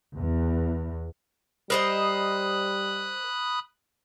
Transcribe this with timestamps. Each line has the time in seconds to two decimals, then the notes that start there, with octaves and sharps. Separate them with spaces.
0.15 E2
1.70 G3 A#4 C5 D#5 B5 D#6 F#6